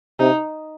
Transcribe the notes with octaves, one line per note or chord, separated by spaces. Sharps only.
C3 D#4